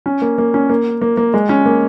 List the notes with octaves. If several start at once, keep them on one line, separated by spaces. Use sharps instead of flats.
C#4
A#3
A#3
C#4
A#3
A#3
A#3
G#3
C#4
A#3